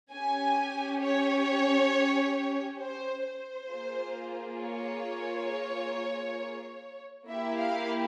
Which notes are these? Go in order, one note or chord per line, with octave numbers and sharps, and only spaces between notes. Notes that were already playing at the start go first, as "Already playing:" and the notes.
C#4 G4 G#5
C#5
C5
C5
A#3 F4 G#4
C#5
A#3 E4 G4 E5
F5